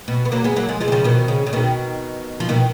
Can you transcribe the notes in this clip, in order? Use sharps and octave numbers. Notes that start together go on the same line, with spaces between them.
B2
B3
F#3 A#3
G#3 B3
F#3 A#3
F3 G#3
F3 G#3
D#3
C#3 F3
B2 D#3
C#3
C#3
B2 D#3
F3
B2 D#3